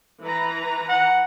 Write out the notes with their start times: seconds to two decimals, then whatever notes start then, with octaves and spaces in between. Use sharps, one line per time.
0.22 E3 B4 A#5
0.89 F#5